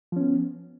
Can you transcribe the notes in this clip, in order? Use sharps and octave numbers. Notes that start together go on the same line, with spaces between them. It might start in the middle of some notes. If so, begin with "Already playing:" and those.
F3 B3 C#4